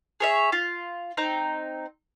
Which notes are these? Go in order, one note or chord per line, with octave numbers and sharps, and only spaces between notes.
G#4 C#5 E5
F4
C4 D#4 A#5